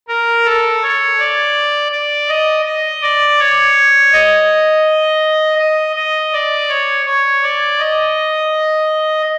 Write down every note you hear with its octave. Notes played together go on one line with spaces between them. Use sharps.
A#4
A4
C#5
D5
D5
D#5
D#5
D5
C#5
D#5
D#5
D#5
D5
C#5
C#5
D5
D#5